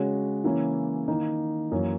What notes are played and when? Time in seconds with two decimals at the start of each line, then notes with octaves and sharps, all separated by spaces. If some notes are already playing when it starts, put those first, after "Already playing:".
Already playing: C#3 G#3 C#4 F#4
0.44 C#3 E3 A#3 C#4 E4
1.08 D#3 A#3 D#4
1.71 F#2 E3 A#3 C#4